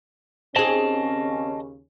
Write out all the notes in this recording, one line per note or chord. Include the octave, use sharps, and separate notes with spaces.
D#2 C#3 C4 C#4 G#4 D#5 A5